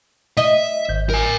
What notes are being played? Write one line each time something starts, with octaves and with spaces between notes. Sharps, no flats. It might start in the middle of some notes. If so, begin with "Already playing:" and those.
D#5 E5
G#1 G6
A#4 G#5